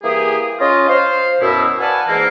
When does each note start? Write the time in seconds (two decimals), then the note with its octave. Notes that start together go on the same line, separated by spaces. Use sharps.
0.03 E3 A#3 G4 G#4
0.60 C#4 F4 D#5
0.89 C5 F5
1.41 F#2 B2 E4
1.80 B4 D5 F5 F#5 G#5 A5
2.08 G#2 E3 A#3